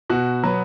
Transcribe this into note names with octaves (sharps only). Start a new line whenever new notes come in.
B2 F#4
F#3 B3